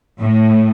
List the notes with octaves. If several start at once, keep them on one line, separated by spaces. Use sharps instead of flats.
A2